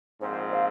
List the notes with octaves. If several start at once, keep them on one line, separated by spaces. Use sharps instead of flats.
A#1 G#2 F3 C4 C5
F5